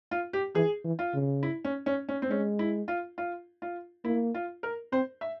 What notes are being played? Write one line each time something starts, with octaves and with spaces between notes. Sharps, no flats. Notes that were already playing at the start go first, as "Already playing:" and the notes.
F4
G4
E3 G#4
E3
F4
C#3
E4
C#4
C#4
C#4
C4
G#3 C#4
E4
F4
F4
F4
A#3 E4
F4
A#4
C4 C5
E5